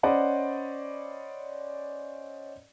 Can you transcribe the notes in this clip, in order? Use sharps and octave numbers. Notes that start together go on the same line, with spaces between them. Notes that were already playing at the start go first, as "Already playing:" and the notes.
C#4 C5 D5 D#5 F#5 B5